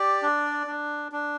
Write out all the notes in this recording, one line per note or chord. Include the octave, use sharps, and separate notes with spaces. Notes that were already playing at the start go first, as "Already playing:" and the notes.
Already playing: G4 D5
D4
D4
D4